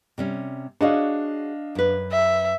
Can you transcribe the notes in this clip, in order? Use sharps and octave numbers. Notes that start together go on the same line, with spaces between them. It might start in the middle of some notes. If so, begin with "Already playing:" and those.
C3 G3 C#4
D4 F#4 G#4 C#5 D#5 F5
F#2 B4
E5